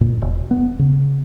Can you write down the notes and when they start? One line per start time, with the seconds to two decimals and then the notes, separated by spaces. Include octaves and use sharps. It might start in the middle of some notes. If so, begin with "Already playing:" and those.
0.01 A#2
0.22 E1
0.51 B3
0.79 C#3